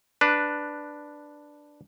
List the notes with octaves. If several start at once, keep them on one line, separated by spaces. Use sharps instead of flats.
D4 B4